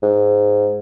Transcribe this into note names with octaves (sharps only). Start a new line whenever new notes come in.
G#2